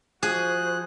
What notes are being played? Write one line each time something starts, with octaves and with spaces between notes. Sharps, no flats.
F3 F#4 G#4 C5 F#6